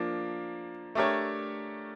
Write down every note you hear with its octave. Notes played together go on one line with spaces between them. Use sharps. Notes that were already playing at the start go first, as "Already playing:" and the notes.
Already playing: F3 A#3 D4
A3 D4 G4 A#4 C#5